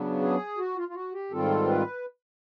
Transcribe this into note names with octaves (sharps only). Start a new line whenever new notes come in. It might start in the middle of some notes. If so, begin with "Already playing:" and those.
Already playing: C#3 F#3 B3 D4
G#4
F#4
F4
F4
F#4
G4
G#2 D#3 G3 C4 F4 A4
B4